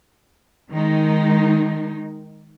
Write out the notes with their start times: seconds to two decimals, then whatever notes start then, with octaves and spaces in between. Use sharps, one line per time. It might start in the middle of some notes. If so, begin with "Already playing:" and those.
0.70 D#3 G#3 D#4